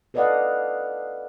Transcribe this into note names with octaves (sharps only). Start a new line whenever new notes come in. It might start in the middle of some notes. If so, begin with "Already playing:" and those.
A4 B4 D5 D#5 F5 F#5